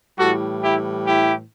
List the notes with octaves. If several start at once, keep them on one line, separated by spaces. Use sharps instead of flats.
A2 E3 G3 F#4 A4
E4 G4
E4 G4